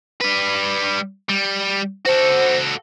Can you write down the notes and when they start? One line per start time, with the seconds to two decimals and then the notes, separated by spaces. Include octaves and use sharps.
0.21 G3 B4
1.29 G3
2.06 F#4 A4 C5